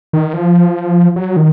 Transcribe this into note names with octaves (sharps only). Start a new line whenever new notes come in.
D#3
F3
F#3
D#3